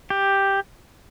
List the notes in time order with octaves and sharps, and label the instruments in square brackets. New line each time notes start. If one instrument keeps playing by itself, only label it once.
[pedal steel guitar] G4